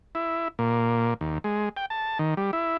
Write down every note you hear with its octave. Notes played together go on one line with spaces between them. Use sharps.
E4
A#2
D#2
G#3
G5
A5
D#3
G3
E4